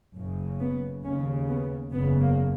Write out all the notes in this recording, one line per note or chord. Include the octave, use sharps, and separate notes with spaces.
F#1 F#2 C#3
B3
D#2 C#3 C#4
B3
F#1 E2 C#3 B3
A#3